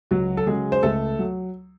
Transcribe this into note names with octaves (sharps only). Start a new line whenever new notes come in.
C#2 F#3 F#4
A4
C#3 F#3 G#3 G#4
C5
C#2 A3 A4
F#3